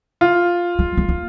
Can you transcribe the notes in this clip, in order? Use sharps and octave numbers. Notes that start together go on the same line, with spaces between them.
F4
G#3
G#3
A#3